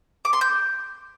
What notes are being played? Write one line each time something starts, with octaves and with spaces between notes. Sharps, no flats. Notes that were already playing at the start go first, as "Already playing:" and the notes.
D6
C6
G6